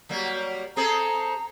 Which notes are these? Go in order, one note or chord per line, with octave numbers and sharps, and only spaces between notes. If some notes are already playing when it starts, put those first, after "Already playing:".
F#3 G3 A#3
C4 G#4 A4 A#5